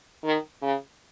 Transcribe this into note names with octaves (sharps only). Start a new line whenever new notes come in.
D#3
C#3